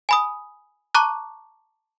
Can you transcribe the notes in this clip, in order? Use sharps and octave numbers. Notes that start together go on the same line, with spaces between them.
G#5 B5 D#6
A5 A#5 C#6 D6 F#6